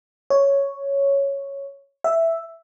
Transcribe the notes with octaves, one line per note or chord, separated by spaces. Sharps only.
C#5
E5